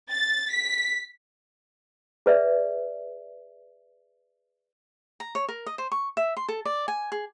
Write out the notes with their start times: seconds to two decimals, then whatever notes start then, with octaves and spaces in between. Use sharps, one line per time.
0.12 A6
0.52 B6
2.26 G#4 B4 D5 E5
5.20 A#5
5.35 C#5
5.48 A#4
5.66 D#5
5.78 C5
5.92 C#6
6.17 E5
6.37 C6
6.49 A4
6.65 D5
6.88 G#5
7.12 G#4